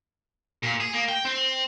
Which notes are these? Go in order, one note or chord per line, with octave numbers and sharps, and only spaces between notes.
A#2
G#4
A#3
G5
C4